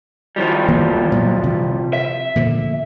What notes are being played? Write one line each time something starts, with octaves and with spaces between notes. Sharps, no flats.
D#3 F3 G3
E3 A#3 B3
A#2 F#3
C3 E3
E5
A#2 D3 F3